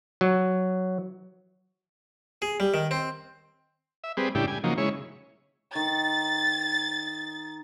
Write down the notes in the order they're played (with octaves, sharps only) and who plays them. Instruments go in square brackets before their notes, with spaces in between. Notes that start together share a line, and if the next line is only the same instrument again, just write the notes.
[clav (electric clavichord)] F#3
[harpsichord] G#4
G3
D#3
C4
[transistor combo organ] E5
G3 C4 G#4 B4
A2 C#3 G3 D4 E4 G4
G3 G#5
C#3 F3 F#3 A#3 D#4
C#3 G#3 E4 C#5
[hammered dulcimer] D#3 D#4 [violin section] A6